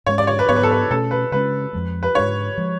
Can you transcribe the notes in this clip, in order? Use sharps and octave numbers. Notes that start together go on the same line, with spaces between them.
G#2 G#3 C#4 C#5
D5
C#5
B4
G#2 F#3 B3 C#5
B4
A4
B4
B2 A3 C#4 A4
B4
C#3 G#3 C#4 B4
F2 F3 G#3
B4
G#2 G#3 D4 C#5
F3 G#3